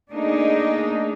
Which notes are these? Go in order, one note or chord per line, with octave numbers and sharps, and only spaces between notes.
A3 A#3 D4 D#4 G#4